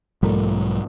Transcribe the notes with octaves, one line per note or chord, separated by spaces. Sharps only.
B1 G#2 F3 G3 A3 A#4